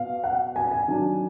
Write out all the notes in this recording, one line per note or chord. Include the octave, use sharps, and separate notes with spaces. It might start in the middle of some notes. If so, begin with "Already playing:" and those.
Already playing: B2 B3 F5
F#5
G#5
G#5
D#3 F#3 D4